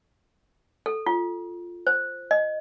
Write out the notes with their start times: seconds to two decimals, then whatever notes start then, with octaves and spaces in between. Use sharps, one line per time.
0.86 A4
1.06 F4
1.87 C5
2.31 D#5